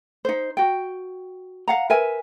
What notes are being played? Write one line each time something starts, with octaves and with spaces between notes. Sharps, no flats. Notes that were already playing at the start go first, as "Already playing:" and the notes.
D#4 C5
F#4 G5
F5 F#5 A#5
A#4 B4 E5 G#5